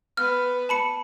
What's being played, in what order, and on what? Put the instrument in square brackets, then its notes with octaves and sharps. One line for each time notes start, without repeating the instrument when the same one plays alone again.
[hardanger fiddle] B3 B4 [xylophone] F6
[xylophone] A5 B5 C#7